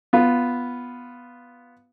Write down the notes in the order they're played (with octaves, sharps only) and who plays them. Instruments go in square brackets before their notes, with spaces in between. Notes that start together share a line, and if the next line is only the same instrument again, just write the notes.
[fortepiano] B3 F4